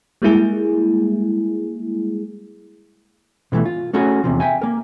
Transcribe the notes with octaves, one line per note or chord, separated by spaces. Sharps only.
G3 G#3 A#3 E4 G#4
B2 D3 E3 A3
F4
A3 C#4 F#4 G#4
E2 C3 F3
E5 G5 G#5
A#3 A#4